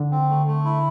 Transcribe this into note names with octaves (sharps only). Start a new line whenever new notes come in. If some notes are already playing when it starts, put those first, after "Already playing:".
Already playing: D3
C4
A3
A3
E4